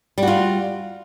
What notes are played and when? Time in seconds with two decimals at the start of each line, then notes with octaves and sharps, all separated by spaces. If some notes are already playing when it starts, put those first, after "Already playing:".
0.18 G3
0.23 F#4
0.28 F4